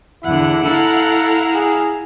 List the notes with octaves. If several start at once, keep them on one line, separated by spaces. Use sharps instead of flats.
E2 D3 E4 F#5
E4 A4 F5 A#5
G#4